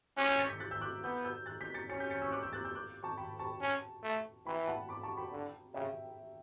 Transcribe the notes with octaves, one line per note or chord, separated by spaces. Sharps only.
C#4 D6 F#6
E6 G6
A6 C#7
G6 B6
F#6 A6
E6 G6
D6 F#6
B3 E6 G6
E6 G6
F#6 A6
G6 B6
A6 C#7
C#4 A6 C#7
G6 B6
A6 C#7
C#6 E6
D6 F#6
E6 G6
F#6 A6
E6 G6
D6 F#6
A5 C#6
G5 B5
A5 C#6
C#4
A3
E3 G5 B5
F#5 A5
B5 D6
A5 C#6
G5 B5
D3
C#3 E5 G5